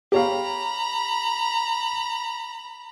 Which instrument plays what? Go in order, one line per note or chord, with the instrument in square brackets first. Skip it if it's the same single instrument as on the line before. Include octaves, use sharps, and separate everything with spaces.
[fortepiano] G4 C#5 F5 [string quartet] A#5 B5